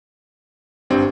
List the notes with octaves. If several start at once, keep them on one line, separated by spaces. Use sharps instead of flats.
G#1 G2 C4